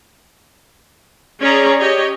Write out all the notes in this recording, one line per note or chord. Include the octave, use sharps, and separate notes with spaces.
C#4 G#4 C#5 D5 A#5
G4 C#5 D#5